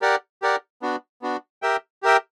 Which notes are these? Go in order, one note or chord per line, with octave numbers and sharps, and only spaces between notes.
G4 A#4 D5 F#5
G4 A#4 D5 F#5
B3 D4 F#4
B3 D4 F#4
G4 A#4 E5 G5
G4 A#4 E5 G5